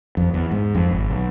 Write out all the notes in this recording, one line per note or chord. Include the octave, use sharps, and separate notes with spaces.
F2
E2
G#2
F2
G#1
B1